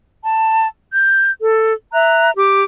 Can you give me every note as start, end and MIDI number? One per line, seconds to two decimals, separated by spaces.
0.22 0.67 81
0.92 1.31 91
1.42 1.72 69
1.93 2.30 76
1.93 2.30 82
1.93 2.30 90
2.37 2.65 67
2.37 2.65 86